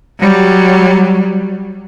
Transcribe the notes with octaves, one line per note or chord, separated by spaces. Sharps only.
F#3 G3